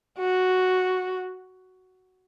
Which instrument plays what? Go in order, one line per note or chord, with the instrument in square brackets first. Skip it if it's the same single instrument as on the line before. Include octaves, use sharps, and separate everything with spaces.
[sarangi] F#4